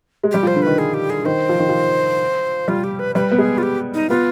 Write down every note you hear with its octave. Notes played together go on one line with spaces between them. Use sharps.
G#3
G3 G4
F3
C5
D3
D#3 B4
G#4
G4
G#4
D#3 C5
F3
D#3
F3
G3 F4
G4
B4
G3 B4
B3
G#3 G#4
F4
G4
D#4
B3 F4